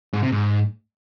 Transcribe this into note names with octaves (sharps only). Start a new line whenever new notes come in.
G#2
C3
G#2